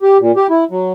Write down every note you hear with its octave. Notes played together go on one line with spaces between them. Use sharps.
G4
A#2
G4
E4
F#3